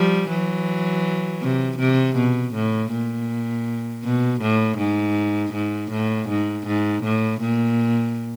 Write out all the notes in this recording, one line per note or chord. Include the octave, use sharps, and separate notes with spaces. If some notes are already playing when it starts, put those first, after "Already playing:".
Already playing: F3 G3
E3 F#3
C3
C3
B2
A2
A#2
B2
A2
G#2
G#2
A2
G#2
G#2
A2
A#2